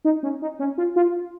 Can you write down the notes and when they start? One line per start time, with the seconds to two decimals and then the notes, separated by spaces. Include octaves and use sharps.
0.05 D#4
0.23 C#4
0.42 D#4
0.59 C#4
0.78 F4
0.96 F4